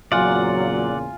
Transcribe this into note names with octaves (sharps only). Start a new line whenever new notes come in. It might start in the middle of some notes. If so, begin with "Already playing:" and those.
E2 A#2 C#3 F#3 F4 D5 F#5 G#5